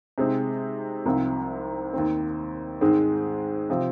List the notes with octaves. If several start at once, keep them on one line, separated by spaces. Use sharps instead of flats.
C3 G#3 C4 D#4
C2 C3 F3 C4 D#4
D#2 D#3 C4
G#2 D#3 G#3 C4 D#4
C3 F3 C4